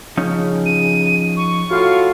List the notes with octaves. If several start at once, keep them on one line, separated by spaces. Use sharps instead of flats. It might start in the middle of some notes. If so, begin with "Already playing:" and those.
C#3 F3 C#4 D#4
D#7
C#6
A2 F4 F#4 F5